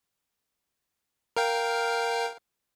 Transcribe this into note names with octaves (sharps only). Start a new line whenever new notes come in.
A#4 F5 G5